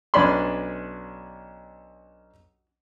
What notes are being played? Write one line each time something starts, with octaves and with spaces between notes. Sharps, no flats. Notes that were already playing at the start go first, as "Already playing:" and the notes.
B1 C#4 D4 D5 B5 C6